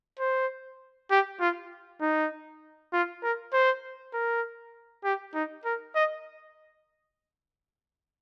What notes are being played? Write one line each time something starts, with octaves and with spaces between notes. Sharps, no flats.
C5
G4
F4
D#4
F4
A#4
C5
A#4
G4
D#4
A#4
D#5